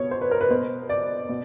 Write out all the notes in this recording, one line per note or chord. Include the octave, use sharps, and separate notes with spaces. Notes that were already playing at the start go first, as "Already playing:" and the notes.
Already playing: B2 C#5
C5
B4
A#4
B4
B2 C5
D5
B2